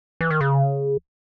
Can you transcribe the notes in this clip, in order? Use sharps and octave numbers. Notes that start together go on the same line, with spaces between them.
E3
D#3
C#3